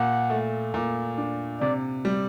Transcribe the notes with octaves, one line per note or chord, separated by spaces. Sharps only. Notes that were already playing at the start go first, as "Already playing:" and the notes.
Already playing: A#2 F#5
A3
A#2
D4
C3 D5
G3